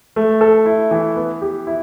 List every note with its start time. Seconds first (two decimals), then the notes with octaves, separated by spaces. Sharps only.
0.16 A3
0.41 A4
0.66 E4
0.91 E3
1.16 B3
1.42 G4
1.67 E4